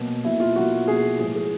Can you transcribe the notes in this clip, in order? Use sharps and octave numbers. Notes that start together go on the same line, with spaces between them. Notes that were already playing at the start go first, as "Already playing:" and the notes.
Already playing: B2 F#3 A#3
B2 F#3 A#3 E4
F4
B2 F#3 A#3 F#4
B2 F#3 A#3 G#4
A2 F3 G#3 B3 G#4
G#4